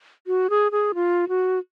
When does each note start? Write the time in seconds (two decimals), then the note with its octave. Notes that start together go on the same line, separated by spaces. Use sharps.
0.27 F#4
0.50 G#4
0.72 G#4
0.95 F4
1.29 F#4